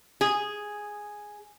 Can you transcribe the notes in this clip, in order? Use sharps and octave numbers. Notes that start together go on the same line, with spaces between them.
G#4